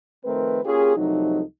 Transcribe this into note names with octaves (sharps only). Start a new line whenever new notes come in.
D#3 F3 A3 C4 A#4 B4
A#3 C#4 F4 G4 G#4
C2 C3 F3 F#3 A3 D#4